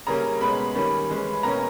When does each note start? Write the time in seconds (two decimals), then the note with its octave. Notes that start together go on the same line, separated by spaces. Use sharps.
0.07 C#3 G3 A#3 C#4 A#5
0.41 B2 G#3 C#4 B5
0.75 D#3 G3 A#3 C#4
1.09 E3 G#3 C#4
1.43 B2 A#3 C#4 A#5